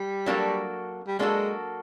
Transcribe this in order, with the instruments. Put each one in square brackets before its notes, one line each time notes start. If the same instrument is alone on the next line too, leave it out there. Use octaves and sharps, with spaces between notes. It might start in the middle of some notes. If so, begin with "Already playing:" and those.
Already playing: [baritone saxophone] G3
[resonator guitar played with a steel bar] F#3 A#3 D4 F#4 A4
[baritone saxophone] G3
[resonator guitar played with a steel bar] F#3 A#3 D4 F#4 A4 [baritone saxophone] G#3